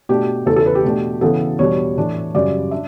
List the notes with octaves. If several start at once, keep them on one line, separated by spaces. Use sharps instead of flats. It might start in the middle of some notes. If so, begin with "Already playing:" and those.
B2 A3 D4 G4
E2 C#3 E3 A4
A4
B4
G4
B2 A3 D4
C#3 E3 B3 A4
E2 B2 G3 D4 C#5
A2 E3 A3 D4
F#2 C#3 G3 C#4 D5
D4 E5